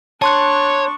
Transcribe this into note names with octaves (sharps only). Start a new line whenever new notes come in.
D4 C#5 A5 C6 C#6 F#6